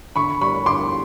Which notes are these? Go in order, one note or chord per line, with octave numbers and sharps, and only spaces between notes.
D3 B5 C#6
G3 B5 C#6
D3 C6 D6